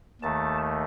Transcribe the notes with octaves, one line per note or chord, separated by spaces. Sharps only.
D#2 D#3 A3 A5